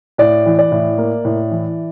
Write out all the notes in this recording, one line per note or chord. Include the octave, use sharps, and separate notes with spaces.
A2 D5
E3
D5
A2
A#3
A2
E3